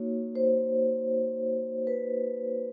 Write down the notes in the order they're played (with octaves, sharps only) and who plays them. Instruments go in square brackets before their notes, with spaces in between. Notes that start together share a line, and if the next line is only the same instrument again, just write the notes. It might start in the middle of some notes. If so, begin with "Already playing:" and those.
Already playing: [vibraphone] A#3 D#4 F#4 C#5
C5
B4